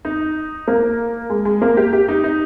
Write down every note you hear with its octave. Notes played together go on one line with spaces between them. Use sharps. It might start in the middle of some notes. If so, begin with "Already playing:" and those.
D#4
A#3
G#3
G#3
A#3
G4
G4
D#4
D#4